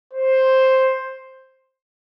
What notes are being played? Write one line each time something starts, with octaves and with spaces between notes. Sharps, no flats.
C5